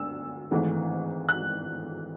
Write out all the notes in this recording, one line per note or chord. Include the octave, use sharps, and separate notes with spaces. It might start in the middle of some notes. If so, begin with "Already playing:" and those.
Already playing: D2 D3 E6
G#1 G#2 E3 A3
F#6